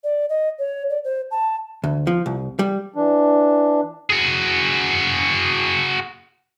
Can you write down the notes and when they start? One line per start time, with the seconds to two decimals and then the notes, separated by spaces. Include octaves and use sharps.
0.04 D5
0.29 D#5
0.59 C#5
0.90 D5
1.04 C5
1.31 A5
1.84 D2
2.07 F3
2.26 C2
2.59 G3
2.95 E3 D4
4.10 F#4 G#4